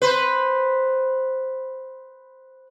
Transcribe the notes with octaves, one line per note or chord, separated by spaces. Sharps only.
B4 C5